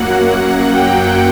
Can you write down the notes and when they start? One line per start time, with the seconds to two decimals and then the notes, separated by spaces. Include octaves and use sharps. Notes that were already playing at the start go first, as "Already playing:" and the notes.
Already playing: F#2 F#3 A#3 F#5
0.70 G5